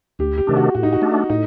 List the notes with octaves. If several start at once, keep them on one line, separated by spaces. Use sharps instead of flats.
D2 G4
G4
C3 D#3 A3 D4
F#4
A2 F#4
D#4
F#4
A3 D4
A2 D#4